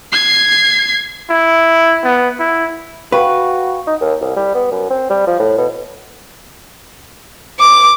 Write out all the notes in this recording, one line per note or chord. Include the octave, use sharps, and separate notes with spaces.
G#6 C7
E4
B3
E4
F#4 B4 F5 G5 C#6
D#4
D#2
C2
G3
B3
F#2
C4
G3
F3
A2
B2
D6